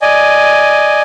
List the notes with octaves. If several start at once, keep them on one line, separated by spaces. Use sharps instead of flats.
D5 D#5 G#5